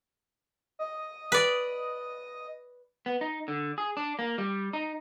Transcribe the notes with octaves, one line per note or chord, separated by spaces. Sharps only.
D#5
B4 D5
B3
D#4
D3
G#4
D4
A#3
G3
D#4